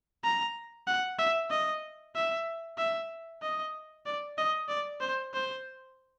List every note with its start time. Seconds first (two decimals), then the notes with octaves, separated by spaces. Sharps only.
0.24 A#5
0.87 F#5
1.19 E5
1.50 D#5
2.15 E5
2.78 E5
3.42 D#5
4.06 D5
4.38 D#5
4.69 D5
5.01 C5
5.34 C5